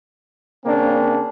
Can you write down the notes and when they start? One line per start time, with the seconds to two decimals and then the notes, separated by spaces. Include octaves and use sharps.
0.65 C#3 A#3 C4 D4